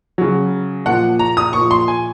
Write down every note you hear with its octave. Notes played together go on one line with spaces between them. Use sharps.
C#3 F#3
A#2 F3 F#5
A#5
D#6
A#2 F3 C#6
C6
G#5